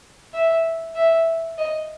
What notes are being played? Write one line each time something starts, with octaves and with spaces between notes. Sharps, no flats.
E5
E5
D#5